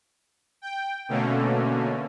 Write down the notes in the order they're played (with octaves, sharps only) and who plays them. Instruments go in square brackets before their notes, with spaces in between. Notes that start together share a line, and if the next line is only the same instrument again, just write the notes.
[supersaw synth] G5
B2 D3 A3 A#3 C#4